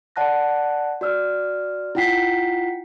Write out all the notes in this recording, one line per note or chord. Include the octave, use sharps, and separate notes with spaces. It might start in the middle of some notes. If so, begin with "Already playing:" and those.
D5 F#5 A5 F#6 A#6
F#4 D5 E6 F6
E4 F4 F#5 G5 B6 C7